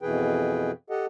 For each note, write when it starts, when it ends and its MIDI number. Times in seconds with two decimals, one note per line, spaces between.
0.02 0.71 41
0.02 0.71 47
0.02 0.71 52
0.02 0.71 68
0.02 0.71 71
0.02 0.71 79
0.90 1.06 67
0.90 1.06 69
0.90 1.06 75
0.90 1.06 78